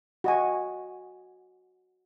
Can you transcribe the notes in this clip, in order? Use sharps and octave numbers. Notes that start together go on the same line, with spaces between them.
F#4 D#5 G#5